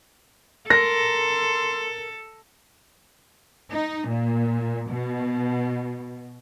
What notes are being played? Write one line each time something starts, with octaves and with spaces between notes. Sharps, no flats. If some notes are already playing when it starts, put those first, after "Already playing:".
A4 A#4 C6 A#6
D#4
A#2
B2